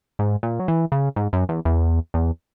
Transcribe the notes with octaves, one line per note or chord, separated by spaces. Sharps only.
G#2
A#2
F#3
E3
C#3
G#2
F#2
E2
E2
E2